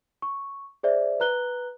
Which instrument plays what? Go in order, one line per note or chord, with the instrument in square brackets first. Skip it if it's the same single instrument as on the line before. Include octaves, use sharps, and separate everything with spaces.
[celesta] C#6
G#4 C5 D5 E5
B4 A#5 F#6 G7